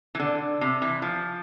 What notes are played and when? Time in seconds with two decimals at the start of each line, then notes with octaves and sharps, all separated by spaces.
0.15 E3
0.20 D3
0.61 C3
0.82 E3
1.02 F3